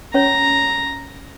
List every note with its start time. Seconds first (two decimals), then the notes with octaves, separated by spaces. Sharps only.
0.14 C#4 C#5 A#5